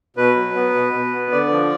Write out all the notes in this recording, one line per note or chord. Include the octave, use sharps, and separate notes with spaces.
B2 B4
F#3
B3
B2
B2
B3
D3 D5
F3